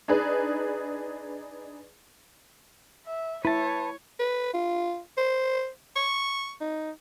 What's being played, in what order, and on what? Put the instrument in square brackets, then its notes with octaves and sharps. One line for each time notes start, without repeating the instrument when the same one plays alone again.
[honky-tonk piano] D4 D#4 G#4 B4
[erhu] E5
[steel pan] E4 [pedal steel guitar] B4 A5 [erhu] C#5
[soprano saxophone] B4
F4
C5
C#6
D#4